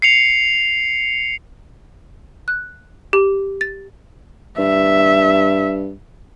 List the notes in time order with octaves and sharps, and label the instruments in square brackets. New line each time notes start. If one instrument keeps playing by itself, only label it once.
[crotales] C7 C#7 F7
[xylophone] F#6
G4
A6
[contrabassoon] G2 [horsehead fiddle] E5